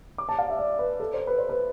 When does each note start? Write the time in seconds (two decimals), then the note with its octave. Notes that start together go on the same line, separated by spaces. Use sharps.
0.18 D6
0.29 A5
0.39 F5
0.50 E5
0.59 D5
0.79 B4
1.00 A4
1.14 C5
1.27 B4
1.38 C5
1.49 B4